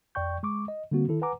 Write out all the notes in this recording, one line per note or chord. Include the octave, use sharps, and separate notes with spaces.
F2 D5 G5 C#6 G6
G#3 C#6 D6
D#5
D3 G3 A#3 C4 F#4
D#3 E4 A4
B4 F#5 G#5 A#5 D6